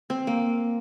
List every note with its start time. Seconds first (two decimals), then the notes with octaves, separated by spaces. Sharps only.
0.10 C4
0.27 A#3